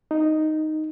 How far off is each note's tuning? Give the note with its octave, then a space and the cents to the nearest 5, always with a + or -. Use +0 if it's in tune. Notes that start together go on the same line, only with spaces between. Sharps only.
D#4 +0